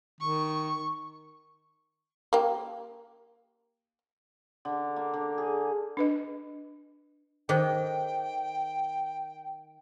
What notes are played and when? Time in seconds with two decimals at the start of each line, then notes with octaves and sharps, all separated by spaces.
0.21 D#3 C#6
2.33 A#3 G4
4.65 D3
4.96 A#3
5.14 D3
5.38 G#4
5.97 D4 B4 D#5
7.49 D#3 G#4 A4 C5 G5